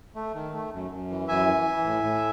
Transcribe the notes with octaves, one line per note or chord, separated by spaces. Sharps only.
A3
D#3
A3
F#2
F#2
E3
F#2 E5 G#5
E3
E3
A2
A2